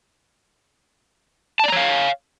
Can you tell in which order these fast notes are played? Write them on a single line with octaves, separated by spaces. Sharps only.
A5 D5 A#5 C#5 F5